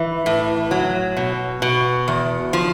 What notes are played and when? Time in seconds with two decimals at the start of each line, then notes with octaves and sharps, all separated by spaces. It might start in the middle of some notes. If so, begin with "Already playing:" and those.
Already playing: E3
0.26 A2
0.71 F#3
1.17 B2
1.62 B2
2.08 E2
2.53 F3